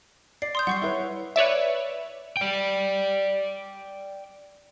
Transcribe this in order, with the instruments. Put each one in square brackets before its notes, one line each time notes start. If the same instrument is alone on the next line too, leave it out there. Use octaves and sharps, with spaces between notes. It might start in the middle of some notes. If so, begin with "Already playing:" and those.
[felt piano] D5 [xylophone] C7
[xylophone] C6 D#6 G6
[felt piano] G3 [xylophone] F#5 C#6 C7
[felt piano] E4 B4 C#5
[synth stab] B4 C#5 D5 E5
[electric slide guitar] D5 G5